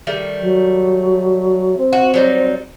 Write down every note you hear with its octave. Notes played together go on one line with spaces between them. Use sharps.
D#3 G3 A3
F#3
C4
F#4
F#3 G3 D#4